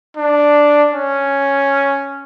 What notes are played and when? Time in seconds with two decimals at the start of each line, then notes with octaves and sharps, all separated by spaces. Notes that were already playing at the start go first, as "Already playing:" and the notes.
0.17 D4
0.91 C#4